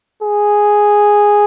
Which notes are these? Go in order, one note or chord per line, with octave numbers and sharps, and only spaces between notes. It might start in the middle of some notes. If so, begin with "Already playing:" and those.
G#4